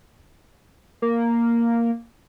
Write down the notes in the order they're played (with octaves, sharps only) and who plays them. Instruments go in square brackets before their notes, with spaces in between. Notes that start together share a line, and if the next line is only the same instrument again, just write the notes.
[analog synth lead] A#3